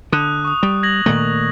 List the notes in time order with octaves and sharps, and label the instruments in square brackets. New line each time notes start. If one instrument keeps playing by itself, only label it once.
[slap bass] D3 [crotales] D#6 F#6
[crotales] C#6 D#6
[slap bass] G3
[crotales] G#6 A#6 F#7
[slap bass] A#2 D#3 A3